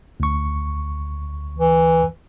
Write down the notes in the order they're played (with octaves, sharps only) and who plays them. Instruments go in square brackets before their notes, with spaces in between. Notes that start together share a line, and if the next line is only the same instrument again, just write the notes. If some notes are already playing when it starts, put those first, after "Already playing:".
[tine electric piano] D2 C#6
[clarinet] E3